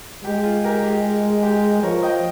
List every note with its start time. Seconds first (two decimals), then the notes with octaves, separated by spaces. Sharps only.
0.24 G#3 G4
0.43 F4 G#4
0.64 G4 A#4
0.84 G4
1.43 G4
1.83 F3 A#4 C#5
2.03 D#5 G5